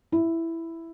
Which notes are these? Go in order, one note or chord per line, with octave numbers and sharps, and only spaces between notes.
E4